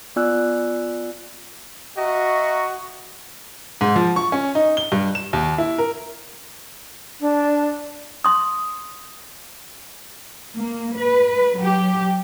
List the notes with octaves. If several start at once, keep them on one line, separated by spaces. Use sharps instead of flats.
B3 F4 D5 G#5 E6 F#6
F#4 D#5 E5 A#5 C#6
G#2
F3
C#6
C#4
D#4
G7
G2
E7
D#2
E4
A#4
D4
C6 D#6
A#3
B4
F#3 G4